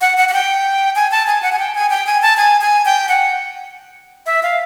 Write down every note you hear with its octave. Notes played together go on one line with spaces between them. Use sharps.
F#5
F#5
F#5
G5
G#5
A5
G#5
F#5
G#5
G5
G#5
G5
G#5
A5
G#5
G#5
G5
F#5
E5
F5